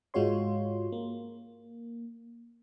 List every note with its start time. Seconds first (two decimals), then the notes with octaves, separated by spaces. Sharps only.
0.14 G#2 G#3 F4 F#4 C#5 C6
0.92 A#3